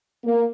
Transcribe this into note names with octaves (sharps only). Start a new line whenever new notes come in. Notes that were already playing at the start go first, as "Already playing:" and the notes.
A#3